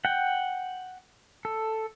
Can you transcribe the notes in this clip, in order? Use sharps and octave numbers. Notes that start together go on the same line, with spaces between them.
F#5 G5
A4